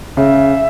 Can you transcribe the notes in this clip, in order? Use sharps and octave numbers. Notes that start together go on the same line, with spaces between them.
C#3 E5